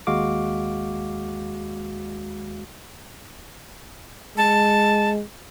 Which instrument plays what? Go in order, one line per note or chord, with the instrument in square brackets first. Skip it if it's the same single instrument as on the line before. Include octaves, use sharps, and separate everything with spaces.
[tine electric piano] D#2 G#3 F#4 F5 D6
[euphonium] G#3 [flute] A5